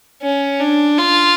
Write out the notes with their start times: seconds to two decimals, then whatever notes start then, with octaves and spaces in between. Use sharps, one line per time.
0.22 C#4
0.60 D4
0.98 F4